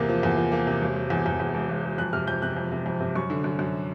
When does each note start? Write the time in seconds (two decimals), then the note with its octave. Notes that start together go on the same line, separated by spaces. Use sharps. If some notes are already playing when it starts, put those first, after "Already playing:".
Already playing: E2 C3 A#3
0.09 F3
0.23 E2
0.37 F3
0.52 A#3
0.67 C3
0.81 E1
0.96 E1
1.10 E2
1.26 E2
1.40 E2
1.54 E1
1.69 E1
1.84 E1
1.98 F2 F#6
2.13 C3 F6
2.27 F2 G6
2.42 C3 F#6
2.57 F2
2.72 C3
2.86 F2
3.00 C3
3.15 F#2 C#6
3.30 D3
3.44 F#2
3.59 F#2